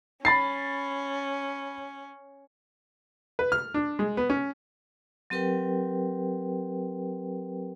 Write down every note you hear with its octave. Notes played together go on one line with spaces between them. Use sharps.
C#4 B5 A6 C7
B4
F6
D4
G#3
B3
C#4
F#3 C4 G4 A#4 B4 G5